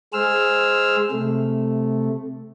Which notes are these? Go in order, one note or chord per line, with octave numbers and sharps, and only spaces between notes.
G#3 G#4 C5 E6 F6
C3 A3